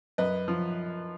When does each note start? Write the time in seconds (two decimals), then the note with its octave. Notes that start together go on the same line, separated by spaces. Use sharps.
0.18 F#2 B4 D#5
0.48 F3